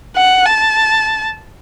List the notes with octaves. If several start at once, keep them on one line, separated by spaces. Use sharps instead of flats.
F#5
A5